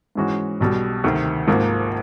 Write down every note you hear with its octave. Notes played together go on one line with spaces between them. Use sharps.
G#2 E3 G#3 C#4 F#4
B1 B2 G3
D2 C3 D#3
G#1 G#2 F3 A#3